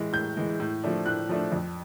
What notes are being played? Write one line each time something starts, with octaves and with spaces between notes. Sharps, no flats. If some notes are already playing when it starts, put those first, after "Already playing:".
Already playing: A2 E3 G#3
A2 G6
E3 G#3
A2
F3 A3 D4
A2 F#6
F3 A3 D4
F2